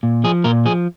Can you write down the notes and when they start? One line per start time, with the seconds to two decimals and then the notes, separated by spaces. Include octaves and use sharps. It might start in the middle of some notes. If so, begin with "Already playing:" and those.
0.03 A#2
0.24 F3 G#4
0.44 A#2 A#4
0.65 F3 G#4